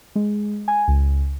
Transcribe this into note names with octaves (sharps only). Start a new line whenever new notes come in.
G#3
G#5
C#2